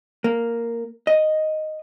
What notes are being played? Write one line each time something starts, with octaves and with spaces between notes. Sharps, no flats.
A#3
D#5